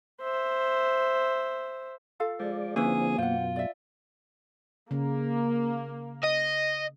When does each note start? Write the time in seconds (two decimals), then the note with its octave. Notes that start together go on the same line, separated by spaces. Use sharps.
0.21 C5 E5
2.20 F4 A4 F5
2.40 F3 G#3 D5
2.76 D3 F3 A#3 C4 C#4 E4 G#4 B4
3.18 F#2 B2 F4 C5 F#5
3.56 D5 E5
4.91 C#3 A#3
6.24 D#5